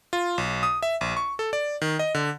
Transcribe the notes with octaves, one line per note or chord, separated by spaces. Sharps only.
F4
B1
D#6
E5
A#1
C#6
A4
D5
D#3
D#5
D3